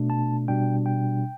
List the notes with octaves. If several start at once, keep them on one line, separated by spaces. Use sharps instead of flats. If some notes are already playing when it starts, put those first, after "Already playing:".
Already playing: B2 A3 D4
A5
B2 G3 D4 G5
G5